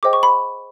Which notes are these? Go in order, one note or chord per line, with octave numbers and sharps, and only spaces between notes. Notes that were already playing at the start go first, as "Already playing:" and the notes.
G#4 C5 D#5 G5 D6
C#6
B5